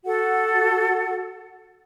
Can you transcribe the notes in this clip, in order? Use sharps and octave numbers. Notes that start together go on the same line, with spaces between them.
F#4 A4 F#5